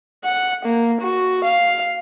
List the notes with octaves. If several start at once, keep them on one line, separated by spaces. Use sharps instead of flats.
F#5
A#3
F#4
F5